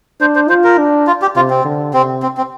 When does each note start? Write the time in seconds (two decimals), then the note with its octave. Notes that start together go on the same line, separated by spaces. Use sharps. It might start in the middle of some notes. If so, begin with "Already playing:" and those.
0.21 D4 C5
0.35 C5
0.49 F4 C5
0.64 A#4
0.78 D4
1.07 F4
1.22 G4
1.36 C3 F4
1.50 C4
1.65 D3
1.93 C3 C4
2.23 C4
2.37 C4